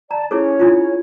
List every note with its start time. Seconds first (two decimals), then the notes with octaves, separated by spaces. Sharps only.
0.11 D5 A5 A#5
0.31 C#4 E4 G#4 A4 C#5
0.60 D4 E4 F4